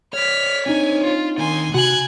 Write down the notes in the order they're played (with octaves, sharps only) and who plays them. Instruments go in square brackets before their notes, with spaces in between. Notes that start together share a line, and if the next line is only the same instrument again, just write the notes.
[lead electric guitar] C#5 D5 [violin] F6 B6
[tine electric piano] C4 D4 D#4 [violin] G#5
[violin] F4
[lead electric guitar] D#3 A#3 [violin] G#5 C6
[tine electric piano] C3 [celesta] F#4 F#7 [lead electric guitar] F#5 G#5 [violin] F#6 G#6